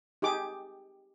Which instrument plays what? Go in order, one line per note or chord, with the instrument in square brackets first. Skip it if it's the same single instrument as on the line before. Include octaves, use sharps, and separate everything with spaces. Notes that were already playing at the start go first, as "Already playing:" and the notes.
[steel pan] D#4 G4 G#4 D6